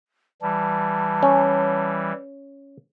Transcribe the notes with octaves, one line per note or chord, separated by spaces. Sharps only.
E3 G3 A5
C#4